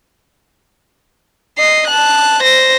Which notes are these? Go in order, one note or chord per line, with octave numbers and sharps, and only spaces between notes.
D#5 C7
A5 F#6
C5 A#6